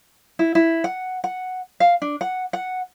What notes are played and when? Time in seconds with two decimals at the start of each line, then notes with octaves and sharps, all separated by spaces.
0.39 E4
0.55 E4
0.84 F#5
1.24 F#5
1.80 F5
2.02 D4
2.21 F#5
2.53 F#5